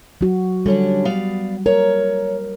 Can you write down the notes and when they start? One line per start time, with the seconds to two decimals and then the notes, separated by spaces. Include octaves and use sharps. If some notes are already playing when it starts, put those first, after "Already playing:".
0.21 F#3 F#4
0.66 D3 G3 C#4 D4
1.05 B3 D5 F5
1.66 A#4 C#5